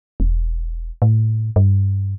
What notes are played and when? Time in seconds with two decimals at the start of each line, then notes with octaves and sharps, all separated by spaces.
0.20 E1
1.02 A2
1.56 G2